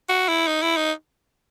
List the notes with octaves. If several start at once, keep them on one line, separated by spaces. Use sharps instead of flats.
F#4
E4
D#4
E4
D#4